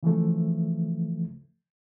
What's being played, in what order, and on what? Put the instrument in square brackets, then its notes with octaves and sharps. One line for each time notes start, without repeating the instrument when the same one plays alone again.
[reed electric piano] C#3 E3 F3 A3